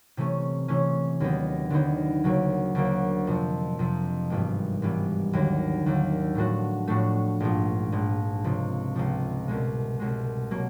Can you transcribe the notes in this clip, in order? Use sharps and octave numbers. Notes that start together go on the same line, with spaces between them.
C3 E3 A3 C#4
C3 E3 A3 C#4
D#2 D3 F#3 B3 D#4
D#2 D3 F#3 B3 D#4
D2 C#3 F#3 A#3
D2 C#3 F#3 A#3
F2 C3 F3
F2 C3 F3
G#1 G2 E3 G3 B3
G#1 G2 E3 G3 B3
D#2 D3 F#3
D#2 D3 F#3
A2 F3 A3 D4 F#4
A2 F3 A3 D4 F#4
A#1 G#2 F3
A#1 G#2 F3
C#2 C3 F3
C#2 C3 F3
C2 B2 G#3
C2 B2 G#3
B2 F#3 A#3